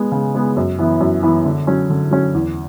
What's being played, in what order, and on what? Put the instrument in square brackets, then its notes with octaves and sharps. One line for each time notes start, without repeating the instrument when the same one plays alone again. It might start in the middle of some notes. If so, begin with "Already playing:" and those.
Already playing: [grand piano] G#3 B3
C#3
G#3 B3
F#2
E3 B3 E4
F#2
E3 B3 E4
D3
F#3 C#4
D3
F#3 C#4
E2